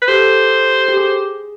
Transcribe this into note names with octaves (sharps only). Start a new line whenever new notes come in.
B4
G4 A4 C5
G4
G#4